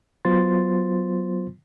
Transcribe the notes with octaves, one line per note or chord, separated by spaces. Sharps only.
F#3 B3 F4 C5 C6 A6